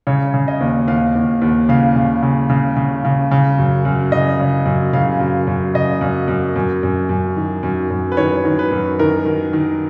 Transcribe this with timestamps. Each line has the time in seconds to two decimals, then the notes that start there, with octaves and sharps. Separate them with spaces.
0.07 C#3 C#5
0.34 C#3
0.48 D#5
0.60 D#2
0.88 D#2 F5
1.15 D#2
1.42 D#2
1.69 C#3 F5
1.96 C#3
2.23 C#3
2.50 C#3
2.77 C#3
3.05 C#3
3.31 C#3
3.58 F#2
3.85 F#2
4.12 C#3 D#5
4.40 C#3
4.66 F#2
4.93 C#3 F5
5.20 F#2
5.47 F#2
5.74 C#3 D#5
6.01 F#2
6.28 F#2
6.56 F#2
6.83 F#2
7.09 F#2
7.37 D#3
7.63 F#2
7.90 F#2
8.12 B4
8.17 D#3 C#5
8.45 D#3
8.59 B4
8.71 F#2
8.99 D#3 A#4
9.25 D#3
9.53 D#3